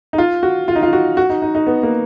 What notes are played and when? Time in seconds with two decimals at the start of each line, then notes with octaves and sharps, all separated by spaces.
0.13 D#4
0.18 F4
0.43 F#4
0.68 F4
0.76 D#4
0.83 F4
0.93 F#4
1.17 F#4
1.30 D#4
1.42 D#4
1.55 D#4
1.67 B3
1.83 A#3